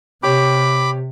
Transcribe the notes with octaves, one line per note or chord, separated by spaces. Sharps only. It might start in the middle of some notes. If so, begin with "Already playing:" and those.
C3 G4 C#5 B5 D6